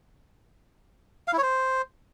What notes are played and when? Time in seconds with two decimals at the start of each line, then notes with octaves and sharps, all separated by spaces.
1.28 F5
1.33 E4
1.38 C#5
1.43 C5